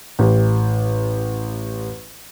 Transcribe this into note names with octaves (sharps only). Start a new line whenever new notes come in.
A1 G4